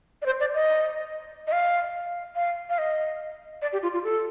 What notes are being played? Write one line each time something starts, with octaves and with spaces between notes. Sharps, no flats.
D5
C5
D5
D#5
D#5
F5
F5
F5
D#5
D5
G4
F4
F4
A4